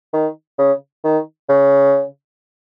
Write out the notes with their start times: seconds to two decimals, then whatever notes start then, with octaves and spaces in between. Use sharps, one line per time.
0.13 D#3
0.58 C#3
1.04 D#3
1.49 C#3